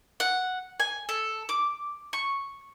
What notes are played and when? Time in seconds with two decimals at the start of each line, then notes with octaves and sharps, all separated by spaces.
0.20 F#5
0.80 G#5
1.09 A4
1.49 D6
2.13 C#6